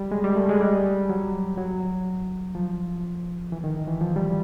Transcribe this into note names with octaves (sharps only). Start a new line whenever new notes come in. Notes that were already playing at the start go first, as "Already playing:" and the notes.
Already playing: G3
G#3
G3
A3
G#3
G3
F#3
F#3
F3
E3
D#3
E3
F3
G3